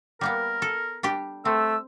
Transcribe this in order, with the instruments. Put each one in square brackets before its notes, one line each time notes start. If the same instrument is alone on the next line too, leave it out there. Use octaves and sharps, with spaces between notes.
[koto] G3 A#3 B3 [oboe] A#4
[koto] A4
G3 D4 G4
[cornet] A3 [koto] C4 [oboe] E6